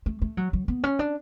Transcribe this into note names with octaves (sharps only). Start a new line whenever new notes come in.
A3
A3
F#3
F#3
B3
C#4
D4